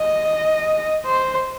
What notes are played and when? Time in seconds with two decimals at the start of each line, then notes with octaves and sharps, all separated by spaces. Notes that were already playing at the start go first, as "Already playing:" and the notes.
Already playing: D#5
1.05 C5